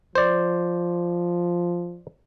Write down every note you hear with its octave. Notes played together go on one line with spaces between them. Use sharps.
F3 C5 D5